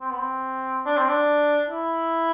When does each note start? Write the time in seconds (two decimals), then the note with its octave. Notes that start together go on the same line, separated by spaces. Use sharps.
0.01 C4
0.11 B3
0.19 C4
0.86 D4
0.97 C4
1.08 D4
1.69 E4